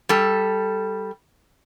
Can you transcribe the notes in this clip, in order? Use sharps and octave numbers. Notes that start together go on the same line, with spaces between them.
G3 A4